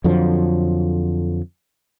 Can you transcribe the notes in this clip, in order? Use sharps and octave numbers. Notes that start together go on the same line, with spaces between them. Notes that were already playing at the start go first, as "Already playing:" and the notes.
F2 D3 F3 F#3